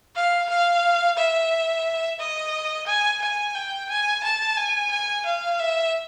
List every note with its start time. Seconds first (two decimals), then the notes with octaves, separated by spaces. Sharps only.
0.15 F5
0.49 F5
1.17 E5
2.19 D#5
2.86 G#5
3.21 G#5
3.55 G5
3.89 G#5
4.23 A5
4.57 G#5
4.91 G#5
5.25 F5
5.59 E5